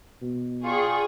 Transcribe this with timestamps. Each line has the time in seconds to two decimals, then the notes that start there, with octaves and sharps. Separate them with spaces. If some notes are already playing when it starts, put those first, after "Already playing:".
0.21 B2
0.64 F4 G#4 D5 G5 C#6